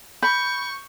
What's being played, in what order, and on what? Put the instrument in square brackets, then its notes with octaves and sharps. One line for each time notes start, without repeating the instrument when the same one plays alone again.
[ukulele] B5 [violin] C#6 [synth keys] G6